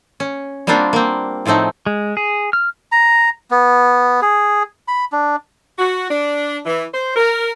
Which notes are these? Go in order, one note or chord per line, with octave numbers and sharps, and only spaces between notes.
C#4
G3 A#3 C4 D4 F4 F#4
A#3 C4
A2 F3 A3 C4 D#4
G#3
G#4
F6
A#5
B3
G#4
B5
D4
F#4
D4
E3
C5
A#4